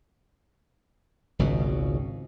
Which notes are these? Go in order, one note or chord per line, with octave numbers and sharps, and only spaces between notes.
G#1 C#2 B2